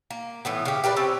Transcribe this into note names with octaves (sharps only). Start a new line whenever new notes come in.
A#3
A2 E3 B3
C#3 G4
G4 A#4 B4 D5
C4 C#4 A5